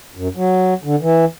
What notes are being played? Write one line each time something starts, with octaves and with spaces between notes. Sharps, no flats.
F#2
F#3
D3
E3